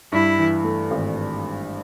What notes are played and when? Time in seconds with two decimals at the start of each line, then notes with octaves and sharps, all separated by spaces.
0.12 G2 E4
0.38 E3
0.64 A3
0.91 G#1